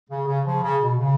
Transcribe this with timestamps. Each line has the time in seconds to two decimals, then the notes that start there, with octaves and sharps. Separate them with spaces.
0.09 C#3
0.27 C#3
0.45 C#3 F3
0.63 C#3
0.82 B2
0.99 C#3